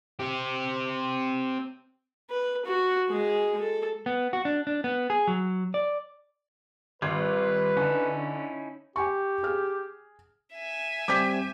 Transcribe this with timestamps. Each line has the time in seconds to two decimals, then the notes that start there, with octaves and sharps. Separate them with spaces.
0.19 C4 G4
2.30 B4
2.65 F#4
3.09 G#3 G#4
3.61 A4
4.06 B3
4.33 F#4
4.45 D4
4.67 D4
4.84 B3
5.10 G#4
5.28 F#3
5.74 D5
7.02 G#1 G3 F4 B4
7.77 D3 C#4 D#4 E4
8.96 G4 G5 G#5 C#6
9.43 G#4 F6
10.56 E5 G#5
11.08 G3 C4 G4 D6 G6 B6